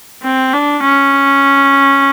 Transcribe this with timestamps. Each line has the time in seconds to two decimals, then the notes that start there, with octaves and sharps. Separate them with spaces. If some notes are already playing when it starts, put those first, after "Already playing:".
0.23 C4
0.53 D4
0.84 C#4